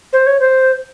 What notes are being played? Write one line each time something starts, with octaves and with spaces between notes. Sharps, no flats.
C5
C#5
C5